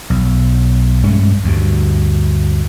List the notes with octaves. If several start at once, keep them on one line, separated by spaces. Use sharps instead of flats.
B1
G2 G#3 A3 C#4
D2 G2